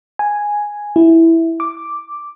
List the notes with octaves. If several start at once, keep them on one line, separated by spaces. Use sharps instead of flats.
G#5
E4
D6